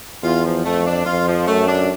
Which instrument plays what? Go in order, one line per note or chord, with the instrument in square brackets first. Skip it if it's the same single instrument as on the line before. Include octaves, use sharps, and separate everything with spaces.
[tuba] E2 [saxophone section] F4
[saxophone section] F3
[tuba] F2 [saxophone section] A3
[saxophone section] D4
[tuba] F2 [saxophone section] F4
[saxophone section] F3
[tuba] F#2 [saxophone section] A3
[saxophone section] D4